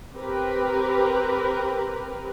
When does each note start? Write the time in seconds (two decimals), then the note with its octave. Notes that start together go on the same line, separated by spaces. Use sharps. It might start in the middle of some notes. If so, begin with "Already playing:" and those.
0.14 C4 G4 A#4 B4